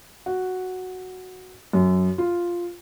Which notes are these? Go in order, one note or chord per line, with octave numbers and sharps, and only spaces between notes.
F#4
F#2
F4